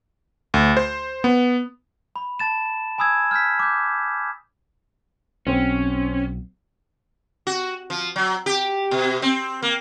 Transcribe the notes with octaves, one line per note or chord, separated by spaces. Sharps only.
D2
C5
B3
B5
A5 A6 E7
G#5 B5 D#6 E6 G#6
F6 G6 G#6 B6
D6 G6
B1 C4 C#4
F#4
F3
F#3
G4
B2
C4
A#3